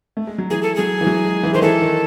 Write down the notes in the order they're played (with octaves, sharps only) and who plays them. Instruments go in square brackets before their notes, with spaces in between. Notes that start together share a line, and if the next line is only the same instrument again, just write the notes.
[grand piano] A3
G#3
F#3
[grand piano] E3 [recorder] G#4
[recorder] A4
[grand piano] F#3 [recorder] G#4
[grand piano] E3
F#3
G#3
E3
[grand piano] D#3 [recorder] C5
[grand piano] E3 [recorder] A4
[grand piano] D#3